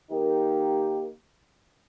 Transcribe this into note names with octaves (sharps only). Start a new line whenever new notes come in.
D#3 A#3 D#4 G4